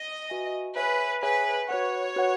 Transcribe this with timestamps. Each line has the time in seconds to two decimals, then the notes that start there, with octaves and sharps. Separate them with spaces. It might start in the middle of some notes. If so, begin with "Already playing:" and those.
Already playing: D#5
0.30 F#4 B4 E5 G#5
0.76 G#4 B4 C#5 E5 G#5
1.22 G#4 B4 C#5 E5 G#5
1.69 F#4 B4 C#5 F#5
2.16 F#4 B4 F#5